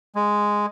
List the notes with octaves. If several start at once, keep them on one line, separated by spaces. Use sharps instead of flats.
G#3